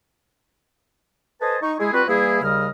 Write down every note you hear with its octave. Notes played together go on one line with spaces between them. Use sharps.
A4 B4 C5 D#5 G#5 A5
D#4 C#6
G#3 E4 G#4
G3 C4 F4 F#4 B4
E3 G3 A#3 E4 G#4
D#2 C#3 G3 D#5 F6